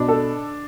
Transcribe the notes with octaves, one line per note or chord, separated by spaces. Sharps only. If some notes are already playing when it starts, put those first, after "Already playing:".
Already playing: B2 D4
A4